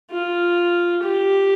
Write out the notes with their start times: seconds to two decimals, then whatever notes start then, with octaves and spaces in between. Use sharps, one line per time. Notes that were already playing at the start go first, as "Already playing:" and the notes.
0.11 F4
1.03 G4